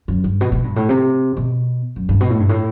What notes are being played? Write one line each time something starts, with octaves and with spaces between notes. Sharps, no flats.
F#2
G2
B2
B2
G2
A2
C3
B2
F#2
G2
B2
A2
G2
A2